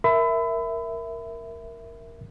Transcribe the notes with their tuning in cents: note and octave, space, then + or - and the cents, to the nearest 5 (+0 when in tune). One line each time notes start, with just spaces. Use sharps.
A#4 +0 E5 +0 B5 +30